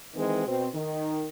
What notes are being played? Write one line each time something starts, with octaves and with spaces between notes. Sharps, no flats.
D#3 E3 G#3 C4
B2 C4
D#3